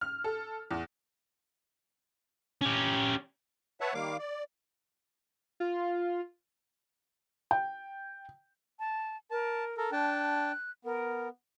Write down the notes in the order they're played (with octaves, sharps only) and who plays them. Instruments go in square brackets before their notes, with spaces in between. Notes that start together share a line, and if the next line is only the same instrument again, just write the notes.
[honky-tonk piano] F6
A4
E2
[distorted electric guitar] C#4 G4
[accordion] B4 C#5 E5 F#5 A5
D#3 G3 A#3 F5 D6
D5
[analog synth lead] F4
[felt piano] G5
[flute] A5
[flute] A#4 [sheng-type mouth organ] A5
[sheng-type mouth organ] A4 A#4
[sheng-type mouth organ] D4 G5 A5 [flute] F#6
[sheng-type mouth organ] B3 [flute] A#4